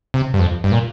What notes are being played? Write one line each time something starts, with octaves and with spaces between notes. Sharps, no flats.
C3
G2
F2
G2
A#2